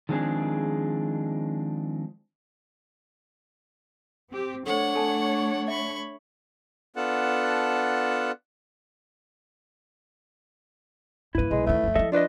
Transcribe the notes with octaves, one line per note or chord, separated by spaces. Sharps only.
D#3 F3 G#3 C4 D4 G#4
C4 G4
A3 D4 A4 C5 C#5 F#5
A4 G#5 A5
E5 B5 C#6
B3 D4 F4 A4 F#5 A5
G2 A#3 E4 B4
B1 G#3
D2 D#3 A3
F#2 E3
F3 E4 A4 D#5 E5
D4 F4 B4 D#5